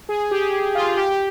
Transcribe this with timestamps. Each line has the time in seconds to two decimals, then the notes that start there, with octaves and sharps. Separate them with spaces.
0.09 G#4
0.31 G4
0.53 G4
0.75 F4
0.97 G4